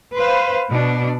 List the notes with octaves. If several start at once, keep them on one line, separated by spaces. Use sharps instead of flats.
B4 C5 F5
B2 D4